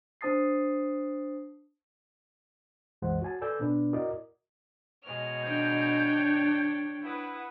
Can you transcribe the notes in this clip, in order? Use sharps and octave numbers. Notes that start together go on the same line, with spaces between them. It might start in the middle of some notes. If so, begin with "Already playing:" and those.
D4 C5 A5 D#6 A6 C7
C2 F#2 E3 G#3 C5 F#5
F#4 C#5 G#5 A5
A4 B4 D5 G#5 E6 G6
B2 B3 D4 B4 D5
E4 F#4 A#4 D5 D#5
B2 G#3 C#5 F6
D4 G5 G6
E4 B4 F#5 D#6